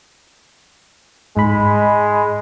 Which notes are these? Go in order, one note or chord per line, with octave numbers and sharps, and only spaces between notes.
G#2 G#3 B5